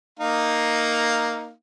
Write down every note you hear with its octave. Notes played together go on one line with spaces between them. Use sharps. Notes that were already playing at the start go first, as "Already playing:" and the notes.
A#3 D#4 F5